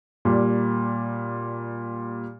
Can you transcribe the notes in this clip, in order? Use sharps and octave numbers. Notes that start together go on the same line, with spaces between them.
A#2 G3